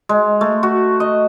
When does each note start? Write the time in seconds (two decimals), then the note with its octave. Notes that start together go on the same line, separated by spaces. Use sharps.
0.09 G#3
0.41 A3
0.63 F#4
1.00 D#5